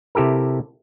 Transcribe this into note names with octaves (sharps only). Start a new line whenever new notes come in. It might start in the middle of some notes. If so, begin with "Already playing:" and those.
C3 E4 G4 A4 A#4